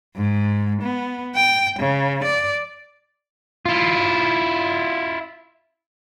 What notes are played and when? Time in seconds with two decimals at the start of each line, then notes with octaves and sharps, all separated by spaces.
0.16 G#2
0.83 B3
1.36 G5
1.80 C#3
2.24 D5
3.66 E4 F4